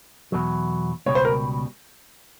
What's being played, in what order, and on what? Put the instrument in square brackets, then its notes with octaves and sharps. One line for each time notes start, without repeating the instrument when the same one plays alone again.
[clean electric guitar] E2 B2 F#3
[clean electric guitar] C#2 B2 G3 [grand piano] C#5
[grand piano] C5
A#4